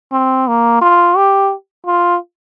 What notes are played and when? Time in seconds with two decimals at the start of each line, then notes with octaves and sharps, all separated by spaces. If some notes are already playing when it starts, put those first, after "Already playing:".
0.12 C4
0.48 A#3
0.81 F4
1.17 G4
1.86 F4